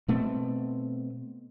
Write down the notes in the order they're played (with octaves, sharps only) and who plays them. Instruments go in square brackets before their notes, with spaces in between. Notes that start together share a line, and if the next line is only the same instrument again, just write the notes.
[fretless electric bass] B2 A3 C4